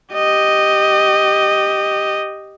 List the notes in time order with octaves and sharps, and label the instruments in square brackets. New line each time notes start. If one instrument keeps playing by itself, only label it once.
[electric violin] G4 D#5